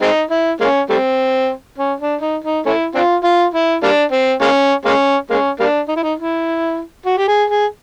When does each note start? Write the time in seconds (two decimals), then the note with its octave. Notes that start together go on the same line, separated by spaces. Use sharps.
0.02 G#3 C4 D#4
0.31 E4
0.60 G#3 A#3 C#4
0.90 G3 A3 C4
1.78 C#4
2.00 D4
2.21 D#4
2.44 D#4
2.66 A3 C#4 E4
2.95 C4 D4 F4
3.24 F4
3.54 E4
3.83 G3 A#3 D4
4.12 C4
4.41 G#3 A#3 C#4
4.85 G#3 A#3 C#4
5.30 G#3 A#3 C#4
5.60 G3 A#3 D4
5.88 D#4
5.96 E4
6.03 D#4
6.18 E4
7.06 F#4
7.18 G4
7.28 G#4
7.50 G#4